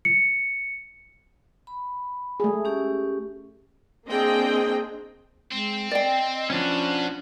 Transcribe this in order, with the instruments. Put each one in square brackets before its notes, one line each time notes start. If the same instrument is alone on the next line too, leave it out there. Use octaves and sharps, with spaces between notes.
[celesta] C#7
[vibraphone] B5
[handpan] A3 G#4
[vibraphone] C#4 G4
[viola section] A#3 C4 D4 G#4 D#5 G5
[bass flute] G#3 [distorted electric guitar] C4
[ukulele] D5 G5 [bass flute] D#5
[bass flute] F3 [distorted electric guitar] B3 F#4 [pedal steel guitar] C#4 D4